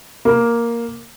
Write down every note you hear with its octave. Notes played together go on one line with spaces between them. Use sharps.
A#3